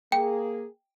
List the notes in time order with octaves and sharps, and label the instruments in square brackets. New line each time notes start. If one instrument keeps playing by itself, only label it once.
[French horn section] A#3 G#4 [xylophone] G5